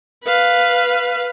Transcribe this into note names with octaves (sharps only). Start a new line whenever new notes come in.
B4 F5